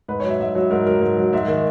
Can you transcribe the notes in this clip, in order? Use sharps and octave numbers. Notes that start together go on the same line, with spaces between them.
G#2 B4
F#3 C#5
E5
G#2 E5
F#3 C#5
G#2 A#4
F#3 A#4
G#2
F#3
G#2 E5
D#3 G#3